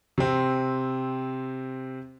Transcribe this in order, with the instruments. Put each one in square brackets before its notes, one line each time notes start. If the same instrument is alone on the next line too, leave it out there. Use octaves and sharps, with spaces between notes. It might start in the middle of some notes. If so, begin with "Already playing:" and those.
[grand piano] C3 C4